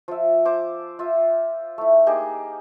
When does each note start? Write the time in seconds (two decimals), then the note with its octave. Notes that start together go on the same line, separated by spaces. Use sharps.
0.08 F3 E5
0.45 C5 D6
0.99 F4 E5
1.78 A3 E4
2.06 A#3 D#4 G4 G#4